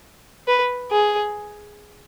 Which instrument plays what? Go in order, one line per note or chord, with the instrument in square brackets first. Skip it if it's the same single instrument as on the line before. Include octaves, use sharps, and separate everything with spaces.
[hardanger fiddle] B4
G#4